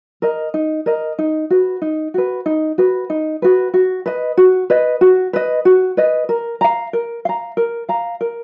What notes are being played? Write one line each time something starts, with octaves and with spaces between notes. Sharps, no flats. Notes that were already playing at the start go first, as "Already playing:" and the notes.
A#4 D#5
D#4
A#4 D#5
D#4
F#4 B4
D#4
F#4 B4
D#4
F#4 B4
D#4
F#4 B4
F#4
B4 D#5
F#4
B4 D#5
F#4
B4 D#5
F#4
B4 D#5
A#4
F5 A#5
A#4
F5 A#5
A#4
F5 A#5
A#4